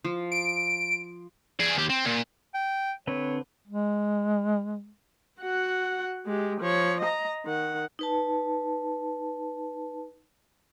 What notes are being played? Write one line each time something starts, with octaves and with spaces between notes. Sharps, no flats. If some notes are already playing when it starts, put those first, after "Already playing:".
F3
D7
G#4 D5
D#2 G4
C4
A#2
G5
D3 C4 B4 C#5
G#3
F#4 F#5
G#3 G4
F3 C#5
D#5 A#5
D#3 F#5
D#4 B4 A5